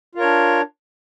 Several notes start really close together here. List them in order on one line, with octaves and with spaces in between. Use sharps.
F4 A#4 C#5 D4